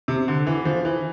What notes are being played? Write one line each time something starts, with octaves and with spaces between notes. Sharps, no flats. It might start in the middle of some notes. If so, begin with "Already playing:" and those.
C3
D3
E3
F3
E3